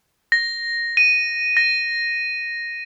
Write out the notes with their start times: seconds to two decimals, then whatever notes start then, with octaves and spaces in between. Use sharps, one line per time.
0.32 A#6
0.97 D#7
1.57 A#6